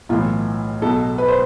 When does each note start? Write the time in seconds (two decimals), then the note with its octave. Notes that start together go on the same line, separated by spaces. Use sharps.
0.09 B1 A2 E3 F4
0.82 B1 B2 A4
1.18 B4
1.28 C5